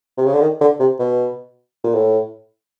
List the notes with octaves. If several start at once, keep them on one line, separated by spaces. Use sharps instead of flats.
C3
C#3
D3
D#3
D3
C3
B2
A#2
A2